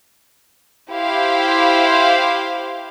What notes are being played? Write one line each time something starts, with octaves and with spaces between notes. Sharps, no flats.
E4 G4 C5 F5